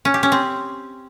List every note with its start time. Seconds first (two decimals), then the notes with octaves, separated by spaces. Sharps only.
0.05 C#4
0.14 G4
0.23 C#4
0.32 C4